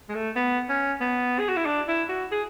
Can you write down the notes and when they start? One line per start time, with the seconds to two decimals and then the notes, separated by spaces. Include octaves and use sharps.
0.09 G#3
0.15 A3
0.36 B3
0.69 C#4
1.01 B3
1.39 G#4
1.49 F#4
1.57 E4
1.65 D4
1.88 E4
2.09 F#4
2.31 G#4